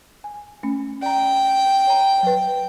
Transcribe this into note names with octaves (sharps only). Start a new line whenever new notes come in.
G#5
A3 C#4
D5 G5 A#5
C#5 A#5
F#3 B4